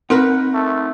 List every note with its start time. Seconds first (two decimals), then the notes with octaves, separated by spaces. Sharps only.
0.10 C4 D#4 A#4 B4 F#5
0.54 A3